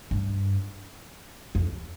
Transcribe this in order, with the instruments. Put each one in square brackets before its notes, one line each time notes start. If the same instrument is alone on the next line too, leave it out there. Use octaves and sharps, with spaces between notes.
[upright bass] G2
F2